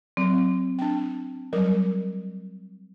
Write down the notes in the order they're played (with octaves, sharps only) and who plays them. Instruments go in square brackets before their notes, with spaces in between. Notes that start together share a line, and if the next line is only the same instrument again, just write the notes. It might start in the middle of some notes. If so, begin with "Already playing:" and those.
[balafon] F#3 [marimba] C4
[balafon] D4 G5
F#3 G3 A#4